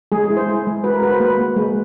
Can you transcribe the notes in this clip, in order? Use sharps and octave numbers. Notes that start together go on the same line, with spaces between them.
G#3 G#4
G#4
E4
C5
E4
G#3
F#4 B4
A#4
F#4 B4
C5
A#3 B4
A#3
G#3